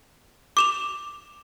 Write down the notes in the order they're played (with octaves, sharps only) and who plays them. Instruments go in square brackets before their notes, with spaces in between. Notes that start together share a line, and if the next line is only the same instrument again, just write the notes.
[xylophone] D6 E7 F7